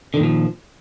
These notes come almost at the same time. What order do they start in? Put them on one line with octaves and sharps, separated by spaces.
D3 D#3 A#2 F3